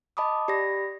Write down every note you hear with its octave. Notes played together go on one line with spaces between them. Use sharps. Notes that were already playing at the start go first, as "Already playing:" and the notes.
D#5 A5 B5 D6 D#6
G4 D5 B5 A#6